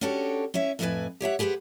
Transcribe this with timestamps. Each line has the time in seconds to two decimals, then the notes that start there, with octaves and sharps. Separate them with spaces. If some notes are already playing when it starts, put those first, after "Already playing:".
0.01 C#4 D4 F#4 G4 A4 C#5
0.54 C#4 E4 C#5 E5
0.79 F2 A2 E4 F#4 B4 G#5
1.21 G4 C#5 E5 F#5
1.39 G4 G#4 B4 C5 F#5